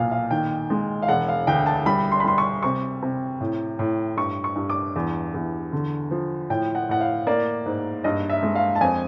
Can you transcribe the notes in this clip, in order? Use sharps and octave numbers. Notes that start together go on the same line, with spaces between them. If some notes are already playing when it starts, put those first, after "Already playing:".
Already playing: B1 A#2 F5
F5
D#3 G5
G#3
F5
E1 F#5
F5
D2 G5
A5
G3 B5
C6
B5
G3 C6
C#6
C3 C#6
C3
A2
A2
G2 C#6
C#6
G2
D6
E2
E2
D3
F3
A2 G5
F#5
A2 F#5
F5
A#3 D5
G#2
G2 D#5
E5
G#3
F5
A5
F2 G#5